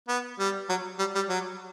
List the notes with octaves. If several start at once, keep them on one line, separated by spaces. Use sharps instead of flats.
B3
G3
F#3
G3
G3
F#3